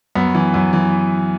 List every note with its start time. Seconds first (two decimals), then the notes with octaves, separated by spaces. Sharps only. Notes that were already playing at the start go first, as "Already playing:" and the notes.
0.15 F#2 B3
0.35 E3
0.54 F#2
0.73 E3